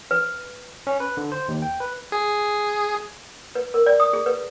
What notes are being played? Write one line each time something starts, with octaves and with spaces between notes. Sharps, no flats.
B4
C#4
B4
D3
C5
D#2
G5
B4
G#4
B4
A#4
D5
D#6
G#4
B4